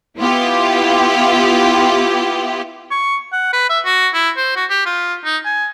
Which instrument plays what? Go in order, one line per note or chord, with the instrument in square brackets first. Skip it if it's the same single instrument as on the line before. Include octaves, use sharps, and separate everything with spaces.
[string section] B3 E4 F4 G4
[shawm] C#6
F#5
B4
E5
F#4
E4
C5
F#4
G4
F4
D#4
G#5